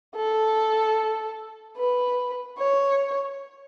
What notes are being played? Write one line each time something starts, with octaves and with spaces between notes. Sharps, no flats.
A4
B4
C#5